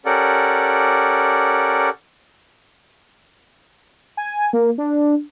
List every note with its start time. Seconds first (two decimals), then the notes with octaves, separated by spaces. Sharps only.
0.06 C#4 G4 A4 A#4 D5 F#5
4.17 G#5
4.53 A#3
4.78 D4